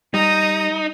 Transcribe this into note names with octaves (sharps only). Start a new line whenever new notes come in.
G3 D#4 A#5 D#6